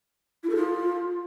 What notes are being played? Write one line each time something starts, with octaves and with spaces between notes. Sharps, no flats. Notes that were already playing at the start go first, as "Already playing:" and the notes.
E4
A4
F4